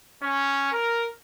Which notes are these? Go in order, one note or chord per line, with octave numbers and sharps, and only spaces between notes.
C#4
A#4